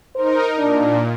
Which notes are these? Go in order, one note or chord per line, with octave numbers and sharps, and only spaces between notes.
D#4 A#4 C5
A#2 D4